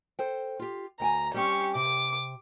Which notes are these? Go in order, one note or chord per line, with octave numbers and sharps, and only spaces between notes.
A4 C5 G5
F4 G4
D2 G5 G#5 A#5
G3 C4 C#4 G4 C#6
C3 D6